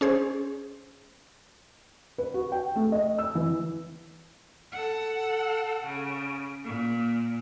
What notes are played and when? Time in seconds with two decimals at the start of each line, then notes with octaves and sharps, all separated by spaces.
0.01 C#4 G#4 C5
2.18 B4
2.34 F#4
2.52 G5
2.76 A3
2.92 D#5
3.19 E6
3.35 E3
4.72 A4 F#5
5.85 C#3
6.64 A#2